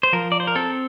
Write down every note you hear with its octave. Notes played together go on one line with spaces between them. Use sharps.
C5
F3 A#4
D5
C5
A#4
C4 A4